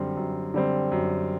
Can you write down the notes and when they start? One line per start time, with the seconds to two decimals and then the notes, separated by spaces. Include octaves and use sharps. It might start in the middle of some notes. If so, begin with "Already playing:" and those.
Already playing: F#2 D3 G3 C4
0.17 F#2
0.54 D3 G3 C4
0.92 F#2